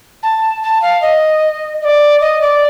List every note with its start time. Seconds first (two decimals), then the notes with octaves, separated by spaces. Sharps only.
0.22 A5
0.62 A5
0.82 F5
1.02 D#5
1.81 D#5
1.84 D5
2.20 D#5
2.41 D5